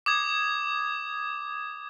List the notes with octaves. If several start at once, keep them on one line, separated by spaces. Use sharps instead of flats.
D6 D#6 G#6